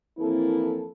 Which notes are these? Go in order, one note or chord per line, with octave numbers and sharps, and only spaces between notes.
F2 E3 A#3 C4 E4 A4